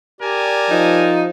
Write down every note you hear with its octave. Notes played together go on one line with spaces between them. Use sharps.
G4 A#4 D5 G#5 A5
F3 D#4